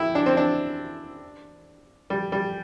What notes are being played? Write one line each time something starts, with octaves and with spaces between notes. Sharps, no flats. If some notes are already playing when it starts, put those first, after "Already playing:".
Already playing: E4 G4
D4
C4
D4
G3
G3